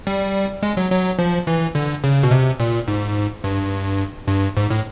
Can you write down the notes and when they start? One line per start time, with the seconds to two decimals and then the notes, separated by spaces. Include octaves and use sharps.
0.07 G3
0.63 G#3
0.77 F#3
0.91 F#3
1.19 F3
1.47 E3
1.75 D3
2.04 C#3
2.23 B2
2.31 C3
2.60 A#2
2.88 G#2
3.44 G2
4.28 G2
4.57 G#2
4.70 A2